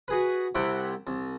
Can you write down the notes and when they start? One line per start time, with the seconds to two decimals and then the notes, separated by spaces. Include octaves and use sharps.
0.08 F#4 G#4 B4
0.55 C2 C3 E4 F#5 G5
1.07 C2